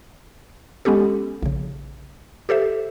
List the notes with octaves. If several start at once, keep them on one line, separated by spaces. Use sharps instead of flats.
G#3 B3 C#4 G4 A4
A#1 C#3
G4 A4 C5 E5